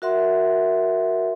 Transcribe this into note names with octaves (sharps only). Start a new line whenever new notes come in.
F#4 A#4 E5 F#5 C6